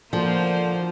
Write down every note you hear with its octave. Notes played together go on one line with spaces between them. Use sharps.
D3 F3 A#3 F4 C5